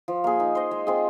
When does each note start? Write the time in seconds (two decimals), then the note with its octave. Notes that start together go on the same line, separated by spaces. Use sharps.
0.08 F3
0.24 A#3 G#4
0.40 D#4
0.55 C5 D#5
0.71 G#3
0.87 C4 F4 G#4